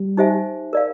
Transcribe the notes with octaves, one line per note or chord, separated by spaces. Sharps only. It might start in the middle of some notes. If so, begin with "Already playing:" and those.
Already playing: G3
D#4 G4 C5 E5 G#5
A#4 D5 F5